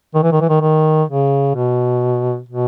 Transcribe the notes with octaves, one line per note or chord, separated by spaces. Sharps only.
D#3
E3
D#3
E3
D#3
D#3
C#3
B2
B2